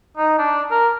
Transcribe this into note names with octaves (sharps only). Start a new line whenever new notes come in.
D#4
D4
A#4